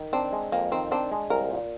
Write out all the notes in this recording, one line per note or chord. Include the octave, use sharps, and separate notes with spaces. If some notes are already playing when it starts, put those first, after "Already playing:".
Already playing: D#3
C4 D4
G#3
F2 A#3
D#3 C4
C4 D4
G#3
C2 A#4
A#2